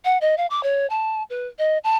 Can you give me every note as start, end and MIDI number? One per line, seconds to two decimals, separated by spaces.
0.05 0.18 78
0.21 0.35 75
0.38 0.47 77
0.50 0.63 86
0.63 0.87 73
0.90 1.23 81
1.30 1.47 71
1.59 1.78 75
1.84 1.96 81